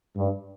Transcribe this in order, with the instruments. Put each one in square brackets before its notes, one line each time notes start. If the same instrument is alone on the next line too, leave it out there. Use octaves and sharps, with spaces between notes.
[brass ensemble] G2